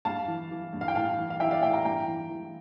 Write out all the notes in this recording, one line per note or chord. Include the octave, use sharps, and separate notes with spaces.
G2 F5 A5
E3
E3
G2
F5
G5
A2 F5 A5
E3
F5
E3 E5 G5
D5 F5
A2 E5 G5
G5 A#5
G2 G5 A#5
E3
E3